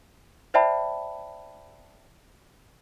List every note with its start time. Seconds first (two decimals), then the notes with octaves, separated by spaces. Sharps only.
0.54 C5 D5 E5 G5 A5 B5